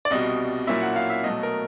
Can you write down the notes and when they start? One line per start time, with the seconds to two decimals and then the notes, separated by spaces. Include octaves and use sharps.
0.05 D5
0.11 C2 B2 G3 D#5
0.67 A#2 F#3 A#3 C#4 E4 E5
0.82 F#5
0.96 F5
1.10 E5
1.24 B2 F#3 A3 D#5
1.43 A#4